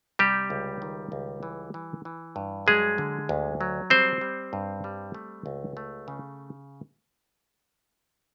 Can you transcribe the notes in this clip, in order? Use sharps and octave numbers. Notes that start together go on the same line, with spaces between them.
C3 G3 G4
C#2
D#3
C#2
E3
E3
E3
G2
F#3 G#3 G#4
D3
D2
F#3
G3 C4 C5
G3
G2
G3
A3
C#2
A3
C#3